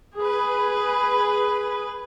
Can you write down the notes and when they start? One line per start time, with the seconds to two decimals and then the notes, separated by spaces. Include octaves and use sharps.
0.16 G#4 B4